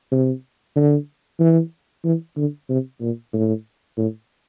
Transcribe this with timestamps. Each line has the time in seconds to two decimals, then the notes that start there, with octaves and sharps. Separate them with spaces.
0.12 C3
0.76 D3
1.40 E3
2.04 E3
2.37 D3
2.69 C3
3.01 A#2
3.33 A2
3.97 A2